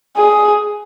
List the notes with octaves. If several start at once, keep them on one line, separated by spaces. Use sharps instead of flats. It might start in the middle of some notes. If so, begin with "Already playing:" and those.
G#4